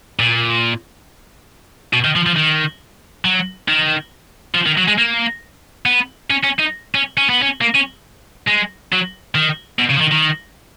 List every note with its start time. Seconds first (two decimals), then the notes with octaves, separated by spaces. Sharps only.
0.19 A#2
1.93 B2
2.05 D#3
2.16 F3
2.26 F3
2.36 D#3
3.25 F#3
3.68 D#3
4.55 F3
4.66 D#3
4.78 F#3
4.88 G#3
4.99 A#3
5.86 B3
6.30 C#4
6.44 C#4
6.60 D#4
6.95 C#4
7.18 C#4
7.30 B3
7.42 C#4
7.61 A#3
7.75 C#4
8.48 G#3
8.92 F#3
9.35 D#3
9.79 B2
9.89 C#3
9.96 F3
10.01 D#3
10.11 D#3